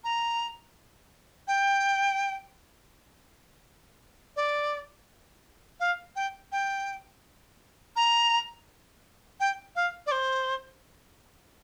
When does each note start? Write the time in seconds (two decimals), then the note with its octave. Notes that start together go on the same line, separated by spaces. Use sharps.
0.04 A#5
1.48 G5
4.36 D5
5.80 F5
6.16 G5
6.52 G5
7.96 A#5
9.40 G5
9.76 F5
10.06 D5
10.12 C5